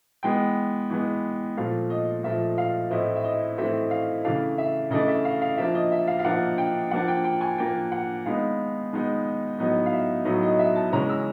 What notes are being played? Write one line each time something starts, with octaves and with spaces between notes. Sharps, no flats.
E3 G#3 B3 G5
E3 G#3 B3
A#2 F3 A3 F5
D#5
A#2 F3 A3 E5
F5
A2 E3 A3 C4 E4 D#5
E5
D#5
A2 E3 A3 C4 E4 E5
F5
C#3 E3 A3 D4 F5
E5
C#3 E3 A3 D4 D#5
E5
F5
F5
F3 A#3 D4 E5
D#5
E5
F5
F5
F3 A#3 D4 F#5
G5
F3 A#3 D4 F#5
G5
G5
G#5
F3 A#3 D4 G5
F#5
D#3 G#3 B3 D#4 F5
D#3 G#3 B3 D#4
A2 F#3 B3 D#4 D#5
F5
E5
A2 F#3 B3 D#4 D#5
D#5
E5
A5
C#3 E3 G#3 C#4 A#5
E6